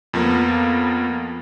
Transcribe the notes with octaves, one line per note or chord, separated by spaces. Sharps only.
F2 F3 A#3 B3